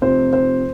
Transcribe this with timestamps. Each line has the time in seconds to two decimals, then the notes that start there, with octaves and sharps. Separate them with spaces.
0.01 F1 F2 C3 C5
0.33 C5